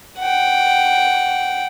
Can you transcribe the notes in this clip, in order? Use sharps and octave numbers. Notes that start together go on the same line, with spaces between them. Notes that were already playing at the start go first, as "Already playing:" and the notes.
F#5 G5